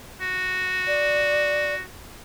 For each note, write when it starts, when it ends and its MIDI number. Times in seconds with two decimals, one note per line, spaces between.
0.21 1.82 66
0.87 1.75 74